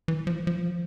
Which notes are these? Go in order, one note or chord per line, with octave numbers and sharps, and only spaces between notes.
E3
F3
F3